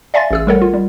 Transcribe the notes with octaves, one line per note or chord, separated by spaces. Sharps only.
D5 E5 F5 G#5 C6 A6
A1 G#4 E6
G3 A3 A4 A#4 C#5 F#5
F4
G3